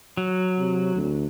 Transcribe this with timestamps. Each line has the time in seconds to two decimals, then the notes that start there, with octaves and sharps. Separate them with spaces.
0.17 F#3
0.59 C3
0.95 D2